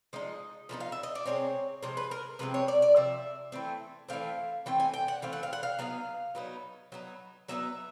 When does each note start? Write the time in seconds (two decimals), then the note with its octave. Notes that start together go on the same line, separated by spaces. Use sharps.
0.13 F3 G#3 D#4 D#5
0.69 F3 G#3 B3 D#4
0.80 F5
0.92 E5
1.03 D#5
1.15 D5
1.26 C3 F3 G#3 C4 C#5
1.83 C3 F3 G#3 C5
1.97 B4
2.11 A#4
2.39 C3 F3 G#3 C4 B4
2.54 C#5
2.68 D5
2.82 D5
2.96 C3 F3 E5
3.52 E3 A3 C4
4.09 E3 A3 C4 F5
4.66 E3 A3 C4 G5
4.80 G#5
4.94 G5
5.08 F#5
5.22 E3 A3 C4 F5
5.33 F#5
5.43 F5
5.53 F#5
5.63 F5
5.79 F#3 B3 D#4 F5
6.35 F#3 B3 D#4
6.92 F#3 B3 D#4
7.48 F#3 B3 D#4 E5